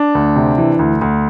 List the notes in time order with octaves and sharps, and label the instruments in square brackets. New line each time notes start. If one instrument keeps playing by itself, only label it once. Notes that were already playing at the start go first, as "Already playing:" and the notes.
Already playing: [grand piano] D4
D2
C3
E3
D2
D2